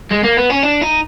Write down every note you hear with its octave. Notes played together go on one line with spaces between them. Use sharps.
G#3
A#3
B3
C#4
D4
D#4